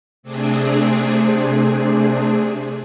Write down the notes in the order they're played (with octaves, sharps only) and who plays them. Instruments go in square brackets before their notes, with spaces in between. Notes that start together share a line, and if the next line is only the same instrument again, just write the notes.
[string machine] C3 A3 C4 D4 G#4